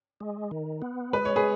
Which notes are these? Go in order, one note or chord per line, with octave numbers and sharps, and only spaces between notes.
G#3
D#3
B3
G#3 B4
C#5
G#4 B4